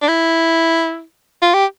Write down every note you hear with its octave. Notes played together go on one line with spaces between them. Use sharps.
D4
E4
F4
G4